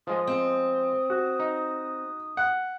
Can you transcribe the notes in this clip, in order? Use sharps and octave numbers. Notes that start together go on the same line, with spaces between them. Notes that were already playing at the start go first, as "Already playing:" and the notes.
F3 G#3 D#5 D#6
C4
F#4
D#4
F#5